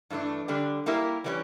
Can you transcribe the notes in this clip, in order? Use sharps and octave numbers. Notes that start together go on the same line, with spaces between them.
G2 E3 A3 D4
D3 G3 D4
G3 A#3 E4 G4 A#4
E3 G3 A#3 C#4